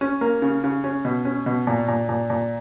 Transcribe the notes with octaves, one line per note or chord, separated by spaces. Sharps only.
C#4
A#3
C#3
C#3
C#4
B2
C#4
B2
A#2
A#2
A#2
A#2